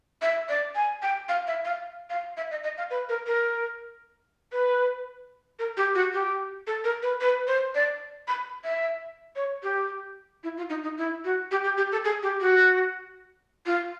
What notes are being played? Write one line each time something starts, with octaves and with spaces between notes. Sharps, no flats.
E5
D5
G#5
G5
F5
E5
F5
F5
E5
D#5
D#5
F5
B4
A#4
A#4
B4
A#4
G4
F#4
G4
A4
A#4
B4
B4
C5
D5
B5
E5
C#5
G4
E4
F4
D#4
D#4
E4
F#4
G4
G4
G4
A4
G#4
G4
F#4
F4